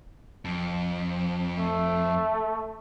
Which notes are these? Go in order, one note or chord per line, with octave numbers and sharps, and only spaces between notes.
F2
A3